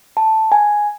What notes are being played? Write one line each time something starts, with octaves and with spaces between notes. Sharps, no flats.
A5
G#5